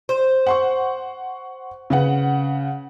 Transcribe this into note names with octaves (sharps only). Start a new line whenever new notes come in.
C5
F#5 C6 C#6
C#3 B4 F#5